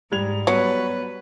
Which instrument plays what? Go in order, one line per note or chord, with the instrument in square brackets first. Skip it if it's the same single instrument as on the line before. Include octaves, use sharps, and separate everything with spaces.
[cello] G#2 [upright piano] G3 G#6 F7
[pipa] F#3 [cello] G3 B4 [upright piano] B3